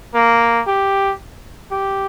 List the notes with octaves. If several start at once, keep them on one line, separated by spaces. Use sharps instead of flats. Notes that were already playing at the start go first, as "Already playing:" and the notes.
A#3
G4
G4